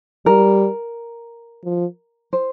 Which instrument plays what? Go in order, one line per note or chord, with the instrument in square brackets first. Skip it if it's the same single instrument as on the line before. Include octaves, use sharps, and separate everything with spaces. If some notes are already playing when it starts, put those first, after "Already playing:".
[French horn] G3 [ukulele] A#4
[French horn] F3
[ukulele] C5